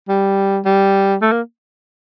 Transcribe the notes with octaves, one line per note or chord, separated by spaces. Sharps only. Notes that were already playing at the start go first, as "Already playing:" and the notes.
G3
G3
A3
A#3